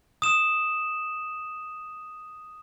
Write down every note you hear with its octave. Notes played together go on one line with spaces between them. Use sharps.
D#6 E7